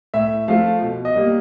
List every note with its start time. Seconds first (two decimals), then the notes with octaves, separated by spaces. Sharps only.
0.14 A2 E5
0.48 F3 A3 F5
0.82 B2
1.05 D#5
1.15 G3 A#3